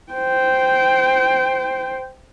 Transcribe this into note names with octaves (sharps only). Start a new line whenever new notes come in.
C5 G5